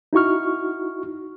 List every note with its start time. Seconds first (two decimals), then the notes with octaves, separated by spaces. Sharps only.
0.13 D#4 E4 F#4 C#6 F6